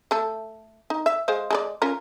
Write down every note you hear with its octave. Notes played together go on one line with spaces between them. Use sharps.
A3 A4
D#4
E5
G#3 C5 F5
G#3 A4 D5
C#4 F4 A#4